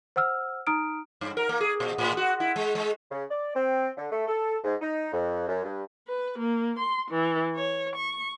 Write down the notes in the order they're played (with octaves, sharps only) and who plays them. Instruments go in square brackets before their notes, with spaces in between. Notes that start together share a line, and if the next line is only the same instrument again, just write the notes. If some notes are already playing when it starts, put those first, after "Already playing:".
[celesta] C5 F#5 E6 F6
D#4 A#5 D#6 F6 D7
[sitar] G2
A#4
A#3
G#4
A#2
A2
F#4
E4
G#3
G#3
[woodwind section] C#3
D5
C4
D3
A3
A4
G#2
D#4
F2
F#2
G2
[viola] B4
A#3
C6
E3
C#5
C#6